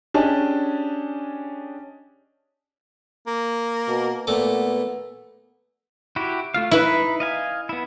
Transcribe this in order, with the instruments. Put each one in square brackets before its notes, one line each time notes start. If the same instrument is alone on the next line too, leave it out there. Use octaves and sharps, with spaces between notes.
[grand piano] C#4 D4 G4 G#4 D#5 A5
[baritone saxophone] A#3
[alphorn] B2
[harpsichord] A#2 A3 D6 [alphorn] B3
[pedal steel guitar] E4 F#4 G4
A3 F4 F5
[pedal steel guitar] D#4 B5 [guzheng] E4 B4
[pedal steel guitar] D#5 F5 G#5
B3 E4